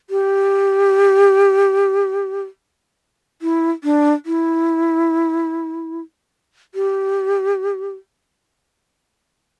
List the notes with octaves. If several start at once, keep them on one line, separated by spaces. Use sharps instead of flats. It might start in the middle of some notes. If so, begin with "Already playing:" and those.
G4
E4
D4
E4
G4